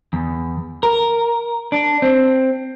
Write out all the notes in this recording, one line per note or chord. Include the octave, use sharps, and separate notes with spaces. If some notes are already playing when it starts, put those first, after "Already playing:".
E2
A#4
D4
C4